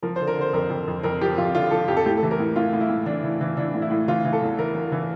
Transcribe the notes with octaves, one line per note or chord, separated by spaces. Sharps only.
F3 A#4
C5
D3
A#4
D3
C5
F2 A#4
F2
F2
F2 A#4
F3 G4
F2 F4
D3 F4
F3 A4
F2 G4
A4
A2 G4
A4
E3
A#4
A2
A2 F4
A2
E4
A2
E3 D4
E3
E3
E3 D4
A2
E4
A2
E3 F4
E3
A4
E2
E3 A#4
E3
E3